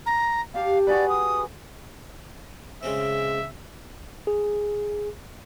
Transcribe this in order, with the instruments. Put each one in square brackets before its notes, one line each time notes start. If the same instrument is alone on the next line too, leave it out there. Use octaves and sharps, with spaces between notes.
[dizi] A#5
[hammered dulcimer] G4 A5 [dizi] F5
[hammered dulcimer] F#4 G#4 B4 [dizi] D5
[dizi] D#6
[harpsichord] C#3 G#3 C4 [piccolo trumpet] E5
[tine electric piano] G#4